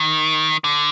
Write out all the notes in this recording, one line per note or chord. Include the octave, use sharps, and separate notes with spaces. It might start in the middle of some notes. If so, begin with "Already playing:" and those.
Already playing: D#3
D3